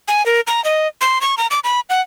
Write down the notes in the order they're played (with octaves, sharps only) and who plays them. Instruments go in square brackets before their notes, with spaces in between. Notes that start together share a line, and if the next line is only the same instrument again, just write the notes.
[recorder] G#5
A#4
A#5
D#5
C6
C#6
A#5
D6
B5
F#5